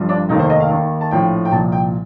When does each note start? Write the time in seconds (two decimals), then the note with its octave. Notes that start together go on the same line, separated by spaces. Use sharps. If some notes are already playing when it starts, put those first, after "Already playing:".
Already playing: G1 G2 F3
0.09 D4
0.29 F1 D#2 D#3 D#4
0.39 C5
0.50 D#5
0.60 F5
0.70 D#2 D#3
1.01 A5
1.11 A#1 A2 F3 G5
1.45 G5
1.52 C2 A#2 F3 A5
1.72 G5